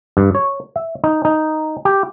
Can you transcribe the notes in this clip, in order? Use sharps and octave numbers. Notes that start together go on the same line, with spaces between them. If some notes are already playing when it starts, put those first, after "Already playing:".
G2
C#5
E5
D#4
D#4
G4